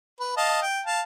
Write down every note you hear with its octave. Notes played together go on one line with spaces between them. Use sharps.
B4
D#5 F5 A5
G5
F5 A5